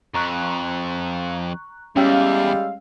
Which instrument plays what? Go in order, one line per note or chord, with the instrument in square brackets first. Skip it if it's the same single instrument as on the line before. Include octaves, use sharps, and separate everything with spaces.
[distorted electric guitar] F2 [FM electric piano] A#5 C#6 F#6
[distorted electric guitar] E2 [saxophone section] G3 G#3 F5 [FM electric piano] C#4 G5 E6